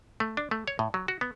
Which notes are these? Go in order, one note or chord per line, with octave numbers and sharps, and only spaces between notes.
A3
D4
A3
C#5
A2
F#3
F#4
B3